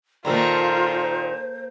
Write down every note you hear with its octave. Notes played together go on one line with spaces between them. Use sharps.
A#2 D#3 A3 A#3 F4 A4 C5 A#5